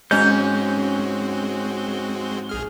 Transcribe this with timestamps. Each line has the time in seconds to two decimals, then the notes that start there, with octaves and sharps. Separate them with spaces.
0.11 G#2 G#3 C4 C#4 F#4 G6
2.49 A#1 G#4 F6